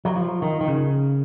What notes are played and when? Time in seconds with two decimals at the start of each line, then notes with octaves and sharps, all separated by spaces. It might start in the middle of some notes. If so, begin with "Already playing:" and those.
0.05 F#3
0.16 F3
0.42 D#3
0.61 D#3
0.68 C#3